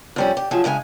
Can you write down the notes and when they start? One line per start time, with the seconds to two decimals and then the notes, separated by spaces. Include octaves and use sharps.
0.16 F2 G3 C#4
0.37 G4
0.51 D#3 F3 F#3 G#4 A5
0.64 D2 C#3 G#3 G#5